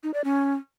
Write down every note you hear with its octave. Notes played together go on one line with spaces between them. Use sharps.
D#4
D5
C#4